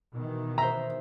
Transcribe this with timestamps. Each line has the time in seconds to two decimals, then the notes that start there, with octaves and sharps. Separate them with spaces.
0.15 B2 D#3 E3
0.58 C5 E5 A#5